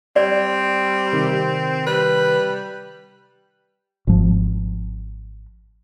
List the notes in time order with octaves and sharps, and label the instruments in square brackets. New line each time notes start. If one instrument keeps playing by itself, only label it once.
[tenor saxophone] G3 [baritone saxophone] C4 [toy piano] D5
[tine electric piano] C3 D#3
[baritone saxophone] G3 [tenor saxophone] B4
[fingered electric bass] G#1 F3